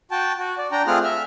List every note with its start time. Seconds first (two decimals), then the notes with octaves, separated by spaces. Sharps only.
0.11 F#4 G5 A5
0.38 F#4
0.58 D5
0.72 D4 G5 A#5
0.87 A3 C4 F4 G#4 F#5 F6
1.04 E5 F6